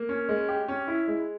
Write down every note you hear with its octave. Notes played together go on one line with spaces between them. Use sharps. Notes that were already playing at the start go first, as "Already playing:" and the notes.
Already playing: A#3
C#4
G#3
G4
C#4
E4
G#3